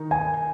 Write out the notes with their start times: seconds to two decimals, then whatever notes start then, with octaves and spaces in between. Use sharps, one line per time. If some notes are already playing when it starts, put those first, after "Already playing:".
Already playing: D#3 D#4
0.11 G#5